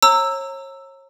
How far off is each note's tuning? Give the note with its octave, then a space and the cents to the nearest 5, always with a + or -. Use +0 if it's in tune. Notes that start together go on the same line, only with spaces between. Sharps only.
C#5 -35 A#5 -20 E6 +0